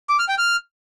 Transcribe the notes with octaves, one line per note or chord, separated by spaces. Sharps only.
D6
F6
G5
F6